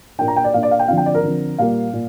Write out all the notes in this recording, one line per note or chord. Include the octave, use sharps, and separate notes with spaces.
A#2 A#3 D4 G5
A#5
G5
D5
A#2 A#3 D4 F5
D5
F5
G5
D3 F3 C4 F5
G5
D5
A#4
D3 F3 C4
A#2 G3 A#3 F5
A#2